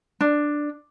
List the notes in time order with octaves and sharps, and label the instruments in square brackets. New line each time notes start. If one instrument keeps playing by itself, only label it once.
[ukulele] D4